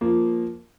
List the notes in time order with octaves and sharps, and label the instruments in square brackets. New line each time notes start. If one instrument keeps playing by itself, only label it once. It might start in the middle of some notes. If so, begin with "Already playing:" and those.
[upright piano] F3 A#3